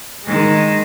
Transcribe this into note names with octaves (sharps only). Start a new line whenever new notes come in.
D#3 G#3